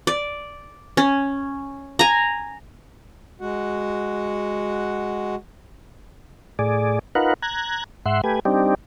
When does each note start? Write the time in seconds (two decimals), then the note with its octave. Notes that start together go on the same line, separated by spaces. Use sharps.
0.07 D5
0.97 C#4
1.99 G#5 A#5
3.40 G#3 F#4 F#5
6.59 A2 G#4 D5
7.15 D#4 F4 A#4 B4 F#5
7.42 A#5 F#6 G#6
8.06 G#2 E5 F#5 C6
8.24 A3 G4 B4 G#5
8.45 G3 C4 D4 D#4 G4